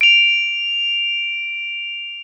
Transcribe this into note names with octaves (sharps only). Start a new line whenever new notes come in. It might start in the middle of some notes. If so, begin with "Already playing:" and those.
D7 F7